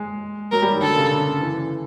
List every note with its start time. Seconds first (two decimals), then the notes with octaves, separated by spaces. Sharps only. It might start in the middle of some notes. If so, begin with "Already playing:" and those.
Already playing: G#3
0.52 F#3 A#4
0.62 G3
0.72 D#3
0.81 D3 A4
0.96 C#3
1.11 D3
1.41 E3